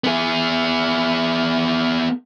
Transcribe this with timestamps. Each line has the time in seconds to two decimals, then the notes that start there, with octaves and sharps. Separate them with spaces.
0.04 B3 G#4